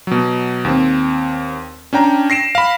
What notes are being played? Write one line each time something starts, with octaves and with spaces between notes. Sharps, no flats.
B2 F#3
D#2 C4
C#4 D4 G5 A#5
A#6 C7 D7 E7
F5 B5